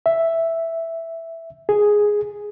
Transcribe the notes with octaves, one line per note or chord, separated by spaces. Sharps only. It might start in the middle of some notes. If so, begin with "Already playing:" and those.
E5
G#4